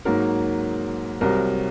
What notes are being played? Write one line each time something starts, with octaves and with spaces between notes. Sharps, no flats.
G#2 F#3 A#3 A#4
C2 C3 F#3 A#4